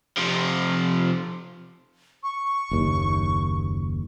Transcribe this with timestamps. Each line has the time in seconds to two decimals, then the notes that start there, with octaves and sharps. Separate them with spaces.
0.18 C3 F3
2.23 C#6
2.71 F#1 D#2